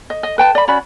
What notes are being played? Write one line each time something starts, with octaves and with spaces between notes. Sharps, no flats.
D#5
D#5
B4 G5 A5
D5 B5
C#4 F#4 D5 B5